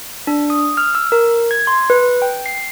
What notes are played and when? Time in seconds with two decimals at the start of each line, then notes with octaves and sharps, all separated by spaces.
0.27 D4
0.50 D#6
0.77 F6
0.95 E6
1.12 A#4
1.51 G#6
1.67 C6
1.90 B4
2.22 G5
2.46 C7